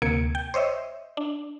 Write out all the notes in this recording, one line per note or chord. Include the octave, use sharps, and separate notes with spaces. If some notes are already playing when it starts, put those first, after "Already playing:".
D2 C3 A#3 G#6 C#7 D7
G5
C5 C#5 D#5 E5
D4